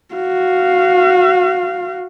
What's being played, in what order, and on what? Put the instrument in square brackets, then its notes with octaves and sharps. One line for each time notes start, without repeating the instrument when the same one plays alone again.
[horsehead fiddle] F#4 F5